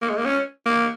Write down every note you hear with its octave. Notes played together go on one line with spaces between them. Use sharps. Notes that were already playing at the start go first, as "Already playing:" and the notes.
A#3
G#3
A#3
C#4
A#3